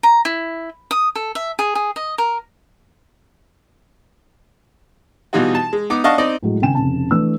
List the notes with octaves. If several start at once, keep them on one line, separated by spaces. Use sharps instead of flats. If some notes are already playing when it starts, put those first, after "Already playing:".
A#5
E4
D#6
A4
E5
G#4
G#4
D#5
A#4
B2 E3 G3 D#4 F4 F#4
A5
G#3
B3 D#4 D6
D4 D#5 F5 F#5 A5 C#6
C4 D#4 D5 D#5
A2 F#3 G#3
G#1 C#3 G5 G#5 E7
F1 C#3 A5
E3 A3 D4 E6